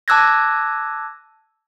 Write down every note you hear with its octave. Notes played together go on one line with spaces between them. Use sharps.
A5 D6 E6 F#6 G#6 A#6